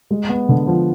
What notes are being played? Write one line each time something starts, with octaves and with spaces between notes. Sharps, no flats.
G#3
B3
D3
F3